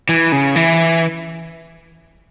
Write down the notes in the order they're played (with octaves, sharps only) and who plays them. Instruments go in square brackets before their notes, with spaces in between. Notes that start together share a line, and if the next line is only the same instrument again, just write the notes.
[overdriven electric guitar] E3
C#3
E3